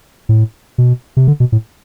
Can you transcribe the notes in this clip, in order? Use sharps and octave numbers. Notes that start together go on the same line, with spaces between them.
A2
B2
C3
D3
B2
A2